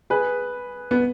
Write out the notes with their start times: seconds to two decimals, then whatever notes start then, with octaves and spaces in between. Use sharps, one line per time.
0.10 G#4 B4
0.91 B3